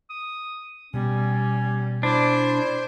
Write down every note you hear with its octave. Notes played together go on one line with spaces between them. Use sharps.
D#6
B2 G3 B3 C#4
D4 E4 C5